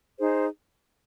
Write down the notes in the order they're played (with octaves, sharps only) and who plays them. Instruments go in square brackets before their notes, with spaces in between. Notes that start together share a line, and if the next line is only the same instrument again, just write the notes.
[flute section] D#4 G#4 C5